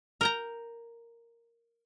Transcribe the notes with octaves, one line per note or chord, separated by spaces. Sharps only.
A#4 G5 A#5